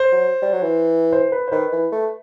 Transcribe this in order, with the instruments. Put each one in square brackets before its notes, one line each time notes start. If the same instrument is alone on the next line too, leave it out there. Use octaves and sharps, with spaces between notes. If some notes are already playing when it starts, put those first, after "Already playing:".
Already playing: [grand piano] C5
[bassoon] F#3
G3
F#3
E3
[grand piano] C5
B4
C5
[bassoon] D#3 [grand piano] B4
[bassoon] E3
A3